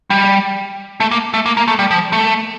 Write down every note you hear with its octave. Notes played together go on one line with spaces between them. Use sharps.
G3
A3
A#3
A3
A#3
A#3
A3
G3
F3
A3